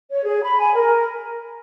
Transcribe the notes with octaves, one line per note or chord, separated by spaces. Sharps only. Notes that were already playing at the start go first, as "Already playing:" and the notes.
C#5
G#4
B5
G#5
A#4